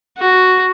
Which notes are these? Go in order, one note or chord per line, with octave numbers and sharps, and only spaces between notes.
F#4